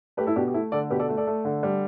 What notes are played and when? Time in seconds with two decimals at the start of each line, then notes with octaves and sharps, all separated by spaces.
0.17 A3 G4 B4
0.27 E4 A4
0.36 B2 D4 G4
0.48 G4
0.54 A3 E4
0.72 D3 A4 D5
0.90 B2 G4 B4
0.99 A4 D5
1.09 A3
1.17 A4 D5
1.27 A3
1.45 D3
1.63 G3